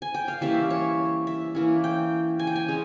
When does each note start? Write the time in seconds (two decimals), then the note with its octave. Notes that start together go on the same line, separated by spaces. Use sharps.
0.02 G#5
0.14 G5
0.28 F5
0.41 E3 G3 A#3 C#4 E5
0.70 C#5
1.27 E5
1.55 E3 A#3 C#4
1.84 G5
2.39 G#5
2.47 G5
2.56 G#5
2.68 G#3 C#4